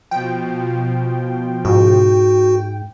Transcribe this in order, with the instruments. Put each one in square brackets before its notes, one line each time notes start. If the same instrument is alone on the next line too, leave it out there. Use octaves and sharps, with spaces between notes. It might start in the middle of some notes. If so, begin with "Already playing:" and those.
[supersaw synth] B2 F3 [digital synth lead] G5
[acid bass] G#2 [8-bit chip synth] F#4